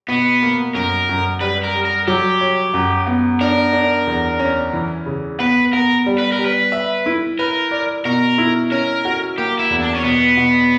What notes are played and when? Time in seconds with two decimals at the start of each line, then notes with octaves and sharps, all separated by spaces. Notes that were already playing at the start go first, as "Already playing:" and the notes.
0.08 B2 B3
0.43 A#3
0.75 F#2 A#4
1.09 F#2
1.41 G3 B4
1.64 A#4
1.75 G3
1.85 A#4
2.08 F#3 G4
2.41 C#5
2.74 F#2
3.07 B3
3.41 D4 A#4
3.73 D4
4.07 E2
4.39 C#4
4.73 E3
5.06 C#3
5.39 B3 B4
5.73 B3 A#4
6.06 G3
6.19 B4
6.32 A#4
6.39 G3
6.45 B4
6.72 E5
7.06 E4
7.39 A#4 B4
7.71 D5
8.05 B2 A#4
8.38 E4
8.72 C#4 A#4
9.05 F#4
9.38 A#3 G4
9.59 E4
9.70 E2
9.82 D4
9.95 C#4
10.04 B2 B3
10.37 B2